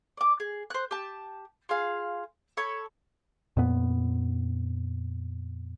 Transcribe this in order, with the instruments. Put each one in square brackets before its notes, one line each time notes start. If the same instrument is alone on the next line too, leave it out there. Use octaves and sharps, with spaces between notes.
[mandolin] D5 D6
G#4
C5 F#6
G4 A5
F4 G#4 F5
A4 C#5 B5
[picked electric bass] F2 A#2 B3